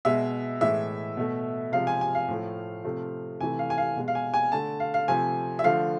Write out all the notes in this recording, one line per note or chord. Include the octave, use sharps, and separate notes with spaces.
B2 G#3 E5
A2 E3 G#3 E5
B2 A3
C3 F3 G#3 F5
G#5
G#5
F5
A2 F3 A3
C3 F3 A3
C3 E3 A3 G#5
F5
G#5
F5
B2 G#3
F5
G#5
G#5
D3 A3 A5
F5
F5
C3 F3 A3 G#5
E5
D3 F3 A3 F5